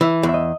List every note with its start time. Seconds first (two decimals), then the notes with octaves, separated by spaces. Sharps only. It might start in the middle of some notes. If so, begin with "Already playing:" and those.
0.01 E3 E5
0.23 E2
0.29 E5
0.34 D#5